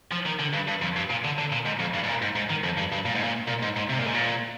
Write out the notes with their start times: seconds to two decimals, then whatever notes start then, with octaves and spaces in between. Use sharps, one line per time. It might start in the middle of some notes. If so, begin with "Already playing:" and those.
0.12 F3
0.26 D#3
0.40 D3
0.54 G2
0.68 G2
0.82 F2
0.96 G2
1.10 A#2
1.24 D3
1.38 D3
1.52 A#2
1.66 G#2
1.80 F2
1.94 G2
2.04 G#2
2.08 A#2
2.22 G#2
2.36 G#2
2.50 D#3
2.64 F2
2.77 G2
2.92 G2
3.05 A#2
3.15 G#2
3.24 A#2
3.48 A#2
3.62 G#2
3.76 G#2
3.90 C3
3.99 A#2
4.06 G#2
4.14 A#2